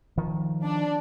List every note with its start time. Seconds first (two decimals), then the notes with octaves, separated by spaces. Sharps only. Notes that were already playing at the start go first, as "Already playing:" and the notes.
0.17 D#3 F3
0.64 D4